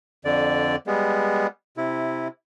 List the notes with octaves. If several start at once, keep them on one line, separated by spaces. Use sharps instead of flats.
F2 D3 D5
G3 G#3 B3
C3 E4